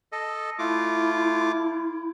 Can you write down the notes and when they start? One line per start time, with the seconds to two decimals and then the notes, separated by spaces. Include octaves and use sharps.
0.12 A4 D#5
0.59 A3 E4 F4 D6